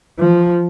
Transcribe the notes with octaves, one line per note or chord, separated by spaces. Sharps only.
F3